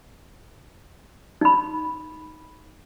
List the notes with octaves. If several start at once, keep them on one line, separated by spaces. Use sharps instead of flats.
D#4 B5